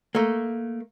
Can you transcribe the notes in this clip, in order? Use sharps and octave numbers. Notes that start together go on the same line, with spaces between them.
A3 A#3